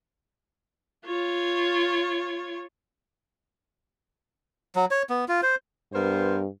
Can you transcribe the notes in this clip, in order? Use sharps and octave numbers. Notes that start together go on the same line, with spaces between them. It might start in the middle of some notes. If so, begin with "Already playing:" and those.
F4 C#5
F#3
C#5
B3
F4
C5
G2 B3 A#4 C5